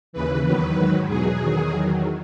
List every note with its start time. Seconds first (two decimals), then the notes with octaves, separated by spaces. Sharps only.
0.13 D#2 C#3 E3 B4
0.45 E2 D#3 F#3 B4
0.76 G#2 D#3 F#3
1.08 E2 B2 F#3 G#4
1.40 E2 D#3 F#3
1.73 E2 D#3 F#3